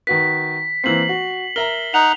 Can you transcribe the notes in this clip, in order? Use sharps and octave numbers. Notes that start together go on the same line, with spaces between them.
D#3 F#4 B4 B6
E3 A#3 C4 C7 F#7
F#4
A#4 E5 A#5 G7
D#4 F#5 F7